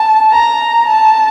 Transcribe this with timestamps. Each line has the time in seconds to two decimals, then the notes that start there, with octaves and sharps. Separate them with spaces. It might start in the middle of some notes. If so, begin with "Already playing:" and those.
Already playing: A5
0.32 A#5
0.87 A5